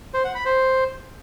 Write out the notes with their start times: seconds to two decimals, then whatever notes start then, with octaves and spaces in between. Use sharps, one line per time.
0.14 C5
0.24 F#5
0.35 B5
0.45 C5